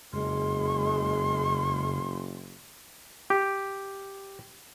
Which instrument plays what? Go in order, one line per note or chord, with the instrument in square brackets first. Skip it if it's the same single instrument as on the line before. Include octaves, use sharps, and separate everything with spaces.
[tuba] F#1 [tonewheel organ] F2 C#3 [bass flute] G#3 [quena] C6
[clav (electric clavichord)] G4